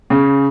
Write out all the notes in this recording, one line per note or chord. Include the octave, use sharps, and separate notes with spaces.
C#3